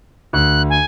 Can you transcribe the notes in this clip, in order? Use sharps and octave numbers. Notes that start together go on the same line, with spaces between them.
D2 F#6
G#5